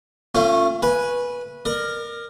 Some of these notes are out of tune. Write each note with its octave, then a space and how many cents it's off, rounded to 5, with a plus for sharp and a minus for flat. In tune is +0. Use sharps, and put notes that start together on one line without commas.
A3 +35 C#4 -15 F4 +0
B4 -15 G#5 +0
A#4 +0 D5 +40